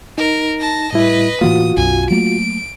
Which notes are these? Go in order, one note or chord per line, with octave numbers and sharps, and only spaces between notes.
D#4 A#4
A5 A#6
A2 G3 E4 B4 D#5
A2 E3 A#3 F4 F#4 D#6
B1 F#2 G#5
F#3 A3 A#3 D7